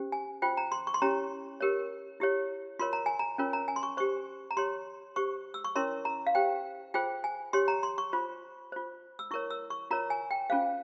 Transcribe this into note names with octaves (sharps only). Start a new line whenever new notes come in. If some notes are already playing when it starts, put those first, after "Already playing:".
Already playing: C#4 G4 C5
G#5
F4 C5 G5
A#5
C6
C#6
C6
C#4 E4 G4 C#5 A#5
G4 A#4 C#5
E4 G4 C#5
F4 A#4 C#5 C6
A#5
G#5
A#5
C#4 F4 A#4 C#5
A#5
G#5
C6
C#6
G4 C5 C#6
A#5
G4 C#5 C6
G4 C5 C#6
E6
C#6
C#4 E4 A#4 C#5 C6
A#5
F5
G4 C5 G5
F4 G#4 C5 G5
G#5
G4 C#5 C6
A#5
C6
C#6
F4 C5
F4 C5
E6
E4 A#4 C#5 C#6
E6
C#6
F4 A#4 C#5 A#5
G#5
G5
C#4 F4 G#4 C5 F5